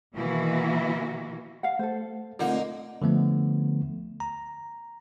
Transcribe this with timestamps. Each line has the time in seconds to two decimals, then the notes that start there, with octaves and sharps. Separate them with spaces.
0.15 B2 D#3 E3 A#3 E4 F#4
1.63 F5 F#5
1.79 A3 A4 C5
2.39 D3 A3 A#3 C4 D#4 F4
3.02 D3 F3 A3 B3
4.20 A#5